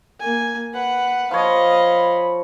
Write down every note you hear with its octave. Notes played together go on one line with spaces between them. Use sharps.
A#3 G#5
B4 F#5
F3 C#5 D#5 F5 B5